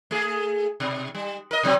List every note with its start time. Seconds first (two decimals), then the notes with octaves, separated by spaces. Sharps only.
0.11 A3 G#4
0.80 B2
1.15 G3
1.51 A#4 D#5
1.63 B2 F#3 C4